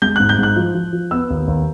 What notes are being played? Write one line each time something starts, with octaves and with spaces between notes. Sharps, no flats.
G#3 G6
F#6
G#2
G6
G#2 F#6
F3
F3
F3
B3 E6
D#2
D#2